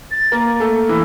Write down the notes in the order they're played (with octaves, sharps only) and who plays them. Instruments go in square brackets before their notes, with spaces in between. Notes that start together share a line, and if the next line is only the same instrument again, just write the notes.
[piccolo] A6
[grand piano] A#3 A#4
A3 A4
E3 E4